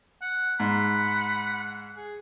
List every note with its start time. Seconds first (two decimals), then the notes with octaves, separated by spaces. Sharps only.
0.21 F#5
0.60 G#2 F#5 B5
1.96 G#4